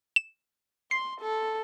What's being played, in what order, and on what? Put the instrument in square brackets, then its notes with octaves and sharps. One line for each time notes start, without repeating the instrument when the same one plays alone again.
[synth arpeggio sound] E7
[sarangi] C6 [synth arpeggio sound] C7
[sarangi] A4